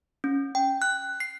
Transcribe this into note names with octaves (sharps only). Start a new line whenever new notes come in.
C#4
G5
F#6
C7